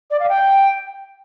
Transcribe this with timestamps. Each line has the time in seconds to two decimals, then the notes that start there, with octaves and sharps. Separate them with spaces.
0.11 D5
0.20 F5
0.29 G5